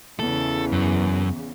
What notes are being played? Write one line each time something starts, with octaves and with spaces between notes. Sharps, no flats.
E2 C#3 A4
F#2